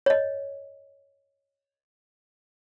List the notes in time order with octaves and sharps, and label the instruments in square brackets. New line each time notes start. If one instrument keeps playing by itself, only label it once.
[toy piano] C#5 D#5